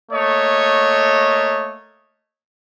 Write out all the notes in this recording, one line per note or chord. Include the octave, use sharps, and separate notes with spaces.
A3 A#3 C#5 D#5